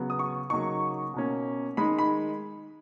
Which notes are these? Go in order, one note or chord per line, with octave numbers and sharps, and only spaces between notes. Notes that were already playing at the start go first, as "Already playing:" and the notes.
Already playing: C#3 F#3 B3
D#6
C#6
C#3 F#3 A#3 D#4 C#6
B2 A#3 C#4
D#3 G#3 D#4 B5
B5